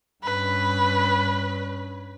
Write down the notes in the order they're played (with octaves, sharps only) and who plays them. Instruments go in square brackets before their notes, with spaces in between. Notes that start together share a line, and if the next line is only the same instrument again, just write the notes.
[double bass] G2 C#4 [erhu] B4